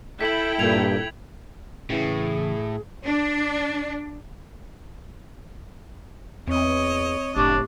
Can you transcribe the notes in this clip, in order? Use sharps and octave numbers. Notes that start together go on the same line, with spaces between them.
E4 A4 G5 B6 F#7
G2 A#2 G#6 F7
A2 C#3 E3 G#4
D4
E2 C4 C#5 D#5
F#1 A2 D4 G4 C#6 D6